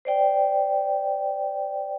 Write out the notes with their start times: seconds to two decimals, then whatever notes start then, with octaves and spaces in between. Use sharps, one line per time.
0.05 C5 D5 G5